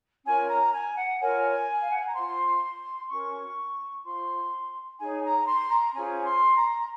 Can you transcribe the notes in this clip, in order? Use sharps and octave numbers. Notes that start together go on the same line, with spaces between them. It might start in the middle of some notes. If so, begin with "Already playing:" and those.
C#4 F4 A#4 C#5 G#5
A#5
G#5
F#5
F4 A#4 C#5 G#5
F5
F#5
G#5
A#5
F4 C5 C6
C#4 F#4 A#4 C#6
F4 C5 C6
D#4 G#4 C#5 G#5
A#5
C6
A#5
C#4 F4 G#4 C5 G#5
C6
A#5